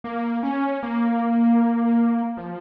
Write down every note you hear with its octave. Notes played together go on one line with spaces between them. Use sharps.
A#3
C#4
A#3
F3